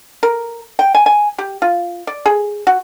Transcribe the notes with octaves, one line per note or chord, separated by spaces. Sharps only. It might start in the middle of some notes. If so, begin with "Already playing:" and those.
A#4
G5
G#5
G#5
G4
F4
D5
G#4
F#4